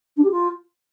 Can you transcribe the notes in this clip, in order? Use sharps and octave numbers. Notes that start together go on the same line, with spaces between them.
D4
G4
F4